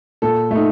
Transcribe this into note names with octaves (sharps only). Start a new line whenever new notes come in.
A#2 A4
A3 D#4